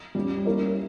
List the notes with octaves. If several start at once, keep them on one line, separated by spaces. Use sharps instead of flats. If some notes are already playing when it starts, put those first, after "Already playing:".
G3 C#4 G4
A#3 E4 A#4 C#5